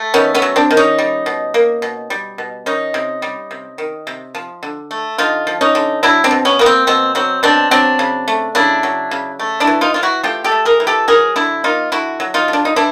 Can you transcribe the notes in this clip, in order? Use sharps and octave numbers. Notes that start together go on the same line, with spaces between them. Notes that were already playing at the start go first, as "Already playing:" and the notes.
Already playing: A3
D#3 B3 C#4
B3 C#4
F#3
C4 D4
D#3
C#4 D#4
G3
B2
A#3
B2
G3
B2
D#3 C#4 D#4
C3
G3
C3
D#3
C3
F3
D3
A3
D3 D#4 F4
F3
C#4 D#4
D3
F#3 D4 E4
C4 D4
B2
B3 C#4
A#3 B3
C4
B2 C4
F#3 C4
B2 C4 D4
F#3 C4 D4
C#3
A3
C#3 D4 E4
F#3
C#3
A3
D4 E4
E3
D#4 F4
E3 F4
E4 F#4
A3 F4 G4
G4 A4
A3
G#4 A#4
E3
G4 A4
F#3 G#4 A#4
D3 D4 E4
A#3 D#4 F4
D3 E4 F#4
F#3
D#4 F4
D3
D4
D#4
E3 D4 E4